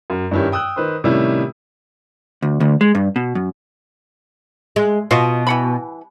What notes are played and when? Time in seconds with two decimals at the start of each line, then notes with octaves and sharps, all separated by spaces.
0.10 F#2
0.31 G2 D#3 C#4 E4 G4
0.52 G5 D#6 E6 F#6
0.76 D#3 B4 C5
1.04 A2 C3 D#3 G3 C#4 E4
2.42 D2
2.60 D2
2.81 G#3
2.95 G2
3.16 B2
3.35 F#2
4.76 G#3
5.11 B2 F4 F#4 D#5
5.47 E3 F#5 B5